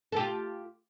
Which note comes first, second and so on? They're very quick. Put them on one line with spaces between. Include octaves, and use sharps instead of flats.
A4 G4 F4